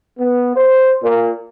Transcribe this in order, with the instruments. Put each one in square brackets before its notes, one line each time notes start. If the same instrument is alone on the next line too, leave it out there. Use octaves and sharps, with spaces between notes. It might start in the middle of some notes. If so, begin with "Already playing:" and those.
[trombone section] B3
C5
A#2